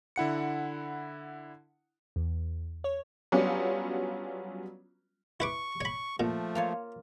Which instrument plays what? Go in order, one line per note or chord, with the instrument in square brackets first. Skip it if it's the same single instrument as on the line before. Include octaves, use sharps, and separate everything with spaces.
[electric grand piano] D3 E4 F#5 C#7
[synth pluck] E2
C#5
[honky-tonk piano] F#3 G3 B3 C#4 D4 F4
[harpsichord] E4 B4 D6 [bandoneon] C#6
[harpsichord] C#5 B5
[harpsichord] A#2 [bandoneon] F3 A3
[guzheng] A#3 F4 C#5